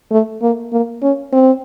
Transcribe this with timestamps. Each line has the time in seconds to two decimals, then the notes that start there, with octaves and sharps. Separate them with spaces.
0.11 A3
0.42 A#3
0.72 A#3
1.03 C#4
1.33 C4